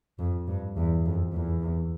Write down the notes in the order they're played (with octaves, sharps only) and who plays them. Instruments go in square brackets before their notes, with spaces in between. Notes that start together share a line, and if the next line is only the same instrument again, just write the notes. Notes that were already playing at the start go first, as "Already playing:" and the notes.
[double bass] F2
G2
E2
F2
E2